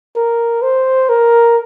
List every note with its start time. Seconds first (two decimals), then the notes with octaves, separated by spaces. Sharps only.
0.15 A#4
0.62 C5
1.09 A#4